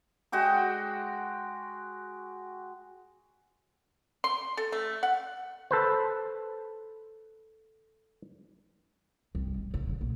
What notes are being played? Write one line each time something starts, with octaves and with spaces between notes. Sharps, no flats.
G#3 F#4 G5 D6
C6
A4
A3
F#5
A4 B4 C5
C2
D#4
C#3
D3
A#1